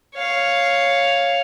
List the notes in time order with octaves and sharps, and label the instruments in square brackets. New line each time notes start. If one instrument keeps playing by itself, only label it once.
[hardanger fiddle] C#5 F5